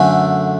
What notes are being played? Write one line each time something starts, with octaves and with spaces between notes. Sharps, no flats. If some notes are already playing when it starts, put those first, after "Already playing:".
Already playing: F#2 D3 A3 G#5